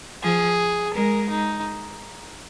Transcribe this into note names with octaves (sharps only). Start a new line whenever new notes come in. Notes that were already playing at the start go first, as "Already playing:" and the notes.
F3 G#4
G#3 A#4
D#4